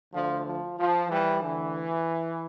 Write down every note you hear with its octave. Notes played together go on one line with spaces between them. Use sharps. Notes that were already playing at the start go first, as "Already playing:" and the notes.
D2 D3 F3
F3
F3
E3 G3
D2 D3 E3